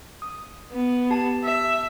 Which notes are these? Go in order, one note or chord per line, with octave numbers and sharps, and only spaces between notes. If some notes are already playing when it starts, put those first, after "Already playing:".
D#6
B3
G4 A5
E5